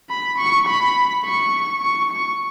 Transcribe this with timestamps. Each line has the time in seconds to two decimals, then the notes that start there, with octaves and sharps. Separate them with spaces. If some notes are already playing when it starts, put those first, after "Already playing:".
0.09 B5
0.38 C#6
0.67 B5
1.25 C#6
1.82 C#6
2.11 C#6